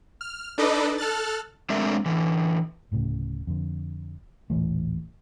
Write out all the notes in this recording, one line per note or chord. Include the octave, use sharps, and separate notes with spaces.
F6
D4 D#4 A4 B4 D5 D#5
A4 F6 F#6 A6
G#3 A3 C4 D4 A#4 E5
D3 E3
D1 A2 C#3
F2 D3
D#1 A1 E3 A3